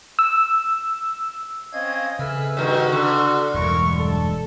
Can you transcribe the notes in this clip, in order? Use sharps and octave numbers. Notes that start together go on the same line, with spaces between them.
E6
C4 C#4 D#5 F5 G#6
C#3 G#4 A4 B4 E5 E6 F6
G2 D#3 F#4
D3
E1 E2 G2 F#3 G#3 E4 A#4 C#6
A4